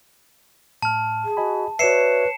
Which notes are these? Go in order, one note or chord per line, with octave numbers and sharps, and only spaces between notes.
A2 A5 F6
G#4
F#4 D#5 G#5 B5
F#4 B4 C#5 D5 E5 C7 C#7 E7